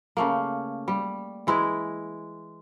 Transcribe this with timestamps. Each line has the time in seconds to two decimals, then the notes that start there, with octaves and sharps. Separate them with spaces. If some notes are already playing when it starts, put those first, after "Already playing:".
0.17 C#3 A3 A#3
0.88 G3
1.47 E3 G#3 E4